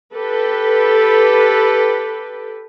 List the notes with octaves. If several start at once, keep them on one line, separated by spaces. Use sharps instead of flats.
G4 A4 B4